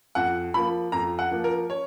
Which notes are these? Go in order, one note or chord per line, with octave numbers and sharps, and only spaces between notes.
F2 F#5
F3 A#3 B5
F2 A#5
F#5
F3 A#3
A#4
C#5